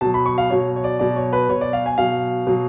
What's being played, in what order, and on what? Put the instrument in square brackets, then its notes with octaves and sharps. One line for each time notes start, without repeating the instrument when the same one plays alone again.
[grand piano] B2 F#3 A5
B5
C#6
F5
B2 F#3 C#5
C#5
D5
B2 F#3 D5
C#5
B4
B2 F#3 C#5
D5
F5
G#5
B2 F#3 F5
B2 F#3